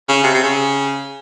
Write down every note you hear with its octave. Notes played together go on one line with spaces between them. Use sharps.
C#3
C3
C3
C#3